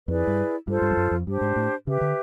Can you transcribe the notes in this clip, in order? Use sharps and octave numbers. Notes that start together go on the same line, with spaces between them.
F2 E4 G#4 B4 D5
G2
G2 F4 A4 C5
G2
F2
F#2
F2
G2 D4 G4 C5
G#2
A2
C#3 G4 B4 E5
D3